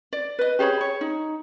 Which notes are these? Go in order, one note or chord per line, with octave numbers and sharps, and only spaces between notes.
D5
B4 D#5
G4 G#4 C#5 B5
C#5
D#4